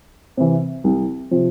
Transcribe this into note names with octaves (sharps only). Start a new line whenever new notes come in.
C3 E3
C2
C3 F3